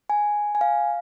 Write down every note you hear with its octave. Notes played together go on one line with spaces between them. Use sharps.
G#5
G#5
F5